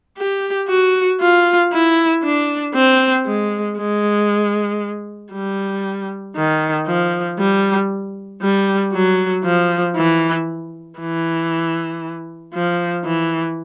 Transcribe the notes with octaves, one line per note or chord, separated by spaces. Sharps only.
G4
F#4
F4
E4
D4
C4
G#3
G#3
G3
D#3
F3
G3
G3
F#3
F3
E3
E3
F3
E3